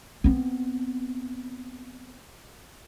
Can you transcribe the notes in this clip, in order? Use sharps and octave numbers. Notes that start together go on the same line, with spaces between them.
B3 C4